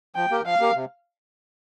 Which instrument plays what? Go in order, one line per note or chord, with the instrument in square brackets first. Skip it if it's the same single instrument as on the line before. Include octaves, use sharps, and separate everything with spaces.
[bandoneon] F3 [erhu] G5
[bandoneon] A#3 G4 A#4
[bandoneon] F3 [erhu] F5
[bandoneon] A#3 G4 A#4
C3